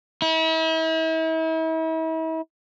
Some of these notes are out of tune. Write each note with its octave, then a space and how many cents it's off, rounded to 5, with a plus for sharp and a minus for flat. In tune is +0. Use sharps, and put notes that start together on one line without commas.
E4 -40